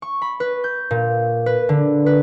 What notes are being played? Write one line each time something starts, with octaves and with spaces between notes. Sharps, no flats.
C#6
B5
B4
G6
A#2
B4
D3
B4